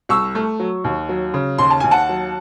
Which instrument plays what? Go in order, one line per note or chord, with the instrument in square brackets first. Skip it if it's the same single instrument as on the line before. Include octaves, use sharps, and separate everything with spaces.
[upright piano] C2 C#6 E6
A3
F#3
D#2
F#3
C#3
D#2 C6
A5
D#2 G#5
F#5 A5
F#3